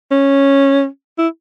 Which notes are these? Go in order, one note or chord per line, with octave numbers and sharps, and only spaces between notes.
C#4
E4